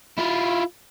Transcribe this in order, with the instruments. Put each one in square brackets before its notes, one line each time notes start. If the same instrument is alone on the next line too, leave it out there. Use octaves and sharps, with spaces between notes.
[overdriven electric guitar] E4 F4